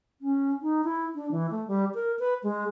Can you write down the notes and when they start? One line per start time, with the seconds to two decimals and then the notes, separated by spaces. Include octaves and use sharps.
0.21 C#4
0.62 D#4
0.84 E4
1.15 D4
1.31 E3
1.51 A3
1.68 G3
1.95 A#4
2.19 B4
2.43 G#3